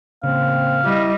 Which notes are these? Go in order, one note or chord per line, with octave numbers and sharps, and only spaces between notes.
A1 C#3 A#3 C4 F5
G3 E4 D#5